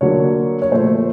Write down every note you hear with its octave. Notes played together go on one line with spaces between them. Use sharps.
D3 F#3 A#3 D4 C#5
C#5
A#2 F3 A3 C5